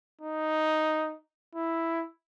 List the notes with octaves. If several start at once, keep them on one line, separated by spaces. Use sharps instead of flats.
D#4
E4